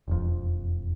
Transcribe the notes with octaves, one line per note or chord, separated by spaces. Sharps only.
E1 F2